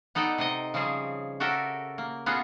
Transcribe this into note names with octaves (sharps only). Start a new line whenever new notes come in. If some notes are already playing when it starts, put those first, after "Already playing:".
B3 D#4 A4 D5 G5
C3 D#4 D#5
C#3 F3 G3 C4 G#4
F#4 G4 A4 A#4 E5
A#3
B3 C#4 F4 F#4 G#4 A4